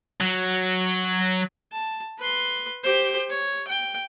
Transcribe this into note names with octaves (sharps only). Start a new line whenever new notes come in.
F#3
A5
B4 C6
G4 C5
C#5
G5